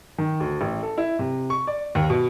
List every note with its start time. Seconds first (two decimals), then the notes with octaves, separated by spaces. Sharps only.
0.18 D#3
0.40 D2
0.61 A1
0.83 A4
0.98 E4
1.19 C3
1.50 C#6
1.67 D5
1.95 D#2
2.10 B2